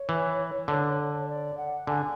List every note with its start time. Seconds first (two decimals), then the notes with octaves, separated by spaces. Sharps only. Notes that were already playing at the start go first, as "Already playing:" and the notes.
Already playing: C#5
0.09 E3
0.68 D3
1.28 D5
1.57 F#5
1.87 D3 G#5